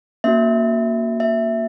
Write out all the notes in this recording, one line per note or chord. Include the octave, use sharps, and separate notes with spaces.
A#3 C#4 F#4 E5
E5